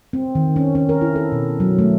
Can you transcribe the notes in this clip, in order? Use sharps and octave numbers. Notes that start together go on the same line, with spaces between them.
C4
D#3
C#4
C#4
A#4
E4
A4
B2
F#3
A3